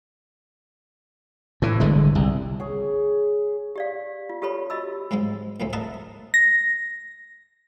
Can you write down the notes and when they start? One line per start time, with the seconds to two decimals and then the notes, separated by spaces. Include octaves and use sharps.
1.62 A2 E3
1.80 G1 D3 G#3
2.15 C2
2.60 G#4 C#5
3.76 G4 D5 F5
4.29 F4
4.42 F4 G4 A4 B4 C#5 B5
4.70 F#4 D#5 B5 E6
5.11 G#2 C#3 F#3 G#3 C4
5.60 C#2 F#2 A2 C#3 A3 C4
5.73 A#4 B4 D#5 E5 F#5 A5
6.34 A#6